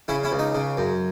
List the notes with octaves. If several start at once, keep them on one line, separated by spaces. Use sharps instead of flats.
C#3 C#4 E4
C#4 E4
C#2
D#4
C#3
F#2